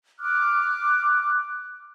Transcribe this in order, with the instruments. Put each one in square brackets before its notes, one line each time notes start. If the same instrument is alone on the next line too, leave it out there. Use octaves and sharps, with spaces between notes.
[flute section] D6 F6 F#6